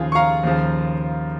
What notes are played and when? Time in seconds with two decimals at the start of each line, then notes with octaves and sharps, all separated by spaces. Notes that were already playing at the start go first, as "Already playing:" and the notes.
Already playing: D#2 C#3 F3 F4 G#4
0.12 C#6
0.15 F5 A#5
0.43 D#2 C#3 F3